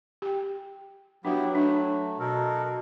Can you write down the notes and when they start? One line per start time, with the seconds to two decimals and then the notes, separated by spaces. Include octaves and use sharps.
0.22 G4 G5
1.25 F#3 B3 D4 E4 F#4 G4
1.55 A3 D4
2.20 B2 A4 A#4